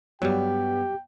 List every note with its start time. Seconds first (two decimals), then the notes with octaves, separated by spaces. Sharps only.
0.22 G2 F#3 G3 B3 G4 G5